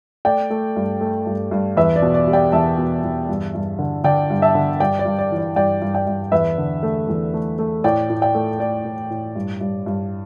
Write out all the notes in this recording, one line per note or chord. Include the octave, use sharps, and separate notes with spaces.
A3 D5 G5
A3
G2
A3
G2
G2
E2 B4 E5
D5
B2
D5
G3
D5 G5
E2 E5 A5
B2
E2
G2
G2
D3
D3 D5 G5
G2
E5 A5
D3
G2 D5 G5
D5
G2
D5
E3
D5
G2 D5 G5
G2
D5 G5
G2
E2 B4 E5
D3
A3
E2
A3
A3
A2 D5 G5
A2
D5 G5
A3
A3 D5
A2
A2
G2
G2
G2